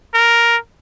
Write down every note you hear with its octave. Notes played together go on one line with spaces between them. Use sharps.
A#4